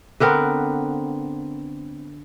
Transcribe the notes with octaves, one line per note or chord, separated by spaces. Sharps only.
D3 B3 C4 A#4